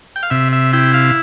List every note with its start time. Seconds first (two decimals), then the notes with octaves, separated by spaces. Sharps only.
0.16 G5
0.23 F5
0.30 C3 E5
0.52 E5
0.73 E4 G5
0.94 F5